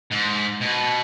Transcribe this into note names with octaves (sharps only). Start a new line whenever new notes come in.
G#2
B2